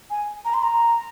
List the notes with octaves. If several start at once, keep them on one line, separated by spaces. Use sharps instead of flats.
G#5
A#5
C6
A#5